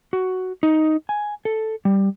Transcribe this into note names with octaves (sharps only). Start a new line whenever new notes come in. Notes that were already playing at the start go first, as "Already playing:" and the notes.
F#4
D#4
G#5
A4
G3